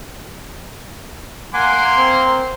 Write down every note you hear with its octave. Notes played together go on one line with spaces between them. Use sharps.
A#3 F#5 G#5 C6 D6
C4